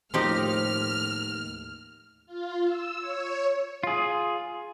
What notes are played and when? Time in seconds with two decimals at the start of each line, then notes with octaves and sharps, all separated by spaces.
0.14 D#2 A2 D#3 F3 D#4 G4 F6 A#6
2.26 F4
2.65 E6
2.99 C#5
3.83 F4 G#4